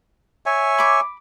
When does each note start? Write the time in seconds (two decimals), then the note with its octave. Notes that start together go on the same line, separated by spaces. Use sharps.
0.46 C#5 E5 G#5
0.78 B5 D6